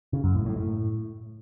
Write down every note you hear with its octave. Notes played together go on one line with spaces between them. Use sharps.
C#3
F#2
A2
A2
A2